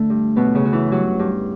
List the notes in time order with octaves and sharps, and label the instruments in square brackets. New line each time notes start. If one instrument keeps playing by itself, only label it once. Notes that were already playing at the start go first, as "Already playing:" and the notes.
Already playing: [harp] D3 A3 D4
G2
F#2 B2 B3
C#3 C#4
F#2 F#4
E3 E4
G2 F#3 F#4
G2